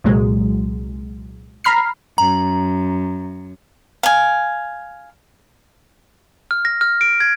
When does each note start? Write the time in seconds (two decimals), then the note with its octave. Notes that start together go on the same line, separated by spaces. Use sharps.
0.04 C2 A#2 F#3 G#3
1.64 A#5 B5 F6 C7
2.18 F#2 A#5
4.03 F5 G#5
6.51 F6
6.65 A#6
6.81 F6
7.01 D7
7.20 G#6